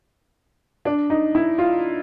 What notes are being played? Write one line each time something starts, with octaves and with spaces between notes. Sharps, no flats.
D4
D#4
E4
F4